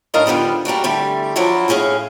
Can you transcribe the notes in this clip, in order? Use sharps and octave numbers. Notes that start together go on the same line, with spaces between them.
A2 D#3 D4 A#4 D#5 F5
G#2 D3 F3 G3 B3
G3 A#3 D4 F#4
E2 D3 G3 A3
F3 F#3 D4 E4 F#4
D#2 A2 C#4 G#4 F5